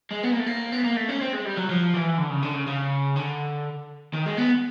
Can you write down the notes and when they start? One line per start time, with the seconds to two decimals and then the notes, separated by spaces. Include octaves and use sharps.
0.11 G#3
0.23 B3
0.31 A#3
0.39 A3
0.46 A#3
0.72 B3
0.84 A#3
0.96 A3
1.09 C#4
1.21 C4
1.33 G#3
1.45 G3
1.57 F#3
1.70 F3
1.94 E3
2.18 D3
2.30 C#3
2.43 D3
2.55 C#3
2.67 C#3
3.16 D3
4.14 D#3
4.26 G#3
4.38 B3